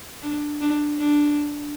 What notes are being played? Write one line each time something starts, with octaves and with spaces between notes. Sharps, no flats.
D4
D4
D4